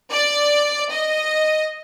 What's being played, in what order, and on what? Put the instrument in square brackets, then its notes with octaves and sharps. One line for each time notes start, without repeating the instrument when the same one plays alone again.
[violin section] D5
D#5